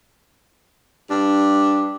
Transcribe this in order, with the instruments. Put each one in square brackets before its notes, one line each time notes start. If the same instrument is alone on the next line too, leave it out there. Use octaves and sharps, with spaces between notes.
[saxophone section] G2 D4